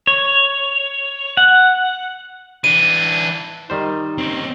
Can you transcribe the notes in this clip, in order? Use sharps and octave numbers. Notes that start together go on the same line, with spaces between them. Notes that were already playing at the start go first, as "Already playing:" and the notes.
C#5
F#5
E3 D4 D#7
D#3 G3 D#4 C5
C4 C#4